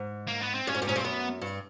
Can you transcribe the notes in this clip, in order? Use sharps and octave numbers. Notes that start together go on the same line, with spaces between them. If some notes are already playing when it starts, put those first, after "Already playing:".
Already playing: G#2
A#3
B3
C4
G2 C#4
G#2
G2
G#2 C#4
G2 C4
F#2 B3
G2